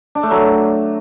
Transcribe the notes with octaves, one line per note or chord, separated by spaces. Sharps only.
D4
A3
F#3